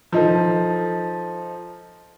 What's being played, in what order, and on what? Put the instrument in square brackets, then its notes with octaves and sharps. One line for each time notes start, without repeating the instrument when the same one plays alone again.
[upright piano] F3 D#4 A4